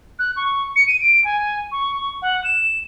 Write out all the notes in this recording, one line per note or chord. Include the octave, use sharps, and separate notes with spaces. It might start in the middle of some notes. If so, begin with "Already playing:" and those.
F#6
C#6
C#7
D#7
D7
G#5
C#6
F#5
E7